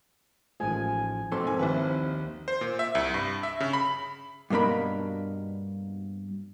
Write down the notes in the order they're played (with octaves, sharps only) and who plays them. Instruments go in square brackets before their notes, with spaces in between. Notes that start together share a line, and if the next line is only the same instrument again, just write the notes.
[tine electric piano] A1 F3 [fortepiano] D#3 G#3 [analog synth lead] G#5
[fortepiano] A#1 B2 C6 [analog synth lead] C4 [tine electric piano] A4
[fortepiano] G#2 A#3 G#5
[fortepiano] A#1 E4 B4 [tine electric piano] D#2
[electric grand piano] C5
A#2
E5
C2
G2
E5
C#3
B5
[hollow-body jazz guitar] G2 B2 A#3 D4 B5